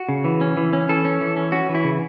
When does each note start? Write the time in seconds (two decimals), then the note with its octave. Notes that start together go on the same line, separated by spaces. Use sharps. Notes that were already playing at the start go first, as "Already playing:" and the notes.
Already playing: F#4
0.09 C#3
0.25 E3
0.41 C#4
0.57 E3
0.73 C#4
0.89 E3 A4
1.05 C#4
1.21 E3
1.37 C#4
1.52 C#4 F#4
1.69 E3
1.75 E4
1.84 C#3